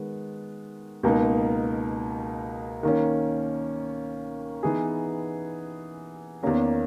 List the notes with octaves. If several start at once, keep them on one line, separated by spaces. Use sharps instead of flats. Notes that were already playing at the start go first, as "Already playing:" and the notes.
Already playing: D#3 G#3 B3
C#2 B2 A#3 D#4
D#3 A#3 C#4
E3 B3 D#4 G#4
E2 D#3 A#3 C#4